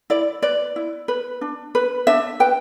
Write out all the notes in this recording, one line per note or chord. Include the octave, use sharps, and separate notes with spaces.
E4 D5
B4 D5
E4
B4
D4
B4
D4 E5
B4 G5